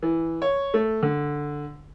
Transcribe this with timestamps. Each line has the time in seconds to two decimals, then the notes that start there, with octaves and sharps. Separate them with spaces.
0.03 E3
0.42 C#5
0.74 A3
1.03 D3